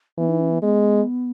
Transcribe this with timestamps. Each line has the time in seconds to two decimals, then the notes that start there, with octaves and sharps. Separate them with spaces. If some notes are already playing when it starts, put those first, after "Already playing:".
0.18 E3 B3
0.29 D#4
0.40 C#4
0.51 B3
0.62 G#3 B3